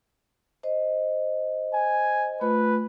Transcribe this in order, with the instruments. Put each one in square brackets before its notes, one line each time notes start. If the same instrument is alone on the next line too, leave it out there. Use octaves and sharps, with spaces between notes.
[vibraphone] C5 D#5
[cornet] G#5
[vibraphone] A3 F4 [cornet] B4